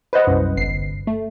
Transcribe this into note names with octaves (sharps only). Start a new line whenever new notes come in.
B4 C5 D#5 F#5
C2 F#2
G1 C7
A3